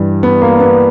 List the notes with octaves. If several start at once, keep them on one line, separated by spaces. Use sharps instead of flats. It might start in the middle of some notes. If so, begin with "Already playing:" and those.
Already playing: G2 E3 G3
B3
A#3
B3